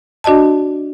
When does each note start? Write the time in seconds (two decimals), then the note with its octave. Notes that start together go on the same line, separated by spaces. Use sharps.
0.24 D4 F#4 D5 D#5 A5